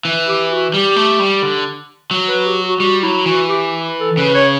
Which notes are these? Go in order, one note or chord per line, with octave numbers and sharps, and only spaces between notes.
E3
G4
F#4
G3 G4
A3
G3
D3
F#3
B4
G4
F#4
G3 F#4
F#3 E4
E3 F#4
G4
A4
C#3 B4
C#5